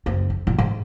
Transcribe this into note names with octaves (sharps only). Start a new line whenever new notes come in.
F#1 C4
F2
A#2 E4
G#2